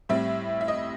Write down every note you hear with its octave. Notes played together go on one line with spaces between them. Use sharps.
A2 G3 C4 E5
E5
D#5